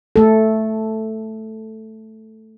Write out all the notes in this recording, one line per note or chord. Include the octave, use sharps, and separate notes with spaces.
A3 A4